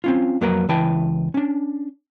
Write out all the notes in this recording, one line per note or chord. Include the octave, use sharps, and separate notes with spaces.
C4 C#4 F4
F2 F#3 A#3 A#4 B4 A#5
C#2 E3 E4 B4 G5 A5
C#4 D4